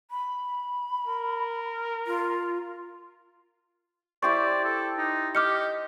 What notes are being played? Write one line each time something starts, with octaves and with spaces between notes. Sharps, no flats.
B5
A#4
F4
E4 G4 C5 D5 C#6
A4
D#4
G4 D#5 D6 F6 C#7